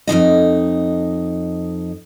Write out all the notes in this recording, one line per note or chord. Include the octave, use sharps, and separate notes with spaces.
F2 D#3 D#4 D#5